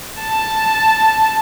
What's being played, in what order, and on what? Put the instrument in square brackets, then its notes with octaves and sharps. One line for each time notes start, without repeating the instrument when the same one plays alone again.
[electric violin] A5